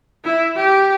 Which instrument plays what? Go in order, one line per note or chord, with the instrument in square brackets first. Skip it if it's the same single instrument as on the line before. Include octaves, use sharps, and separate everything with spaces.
[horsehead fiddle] E4
G4